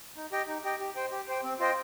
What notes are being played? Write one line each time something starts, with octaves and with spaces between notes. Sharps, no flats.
D#4
G4 D#5 G5
D#4
G4 D#5 G5
G4
C5 G5
G4
C5 G5
C4
F4 C5 D#5 G5